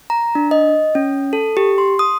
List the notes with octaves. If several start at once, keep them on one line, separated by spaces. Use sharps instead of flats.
A#5
D4
D#5
C#4
A4
G4
C6
D#6